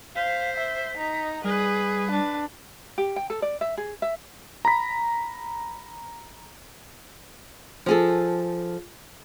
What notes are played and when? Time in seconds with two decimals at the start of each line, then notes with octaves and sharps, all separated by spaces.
0.16 C5 F5 B6
0.56 E5
0.97 D#4 A#5
1.44 G3 G#4 B4
2.11 D4
2.98 G4
3.16 G5
3.30 A4
3.42 D5
3.61 E5
3.77 G#4
4.02 E5
4.65 A#5 B5 B6
7.86 F3 G#4 A4